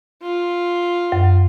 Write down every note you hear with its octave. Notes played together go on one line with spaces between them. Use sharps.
F4
F#2